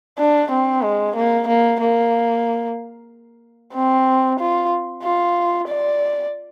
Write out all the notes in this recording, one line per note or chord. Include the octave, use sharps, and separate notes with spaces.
D4
C4
G#3
A#3
A#3
A#3
C4
F4
F4
D5